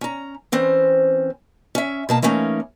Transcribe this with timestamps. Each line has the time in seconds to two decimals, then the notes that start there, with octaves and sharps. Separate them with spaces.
0.01 C#4 A#5
0.52 E3 C4 C#4 C5
1.75 C#4 E5
2.09 B2 A#3 A5
2.22 E3 A3 A#3 C#4 D#4